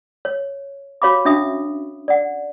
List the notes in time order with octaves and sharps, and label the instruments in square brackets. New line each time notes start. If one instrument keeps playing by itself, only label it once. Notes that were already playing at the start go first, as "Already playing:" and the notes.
[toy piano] C#5
F#4 C#5 F5 B5 D6
C#4 D4 F#4 E5 D#6
D5 F#5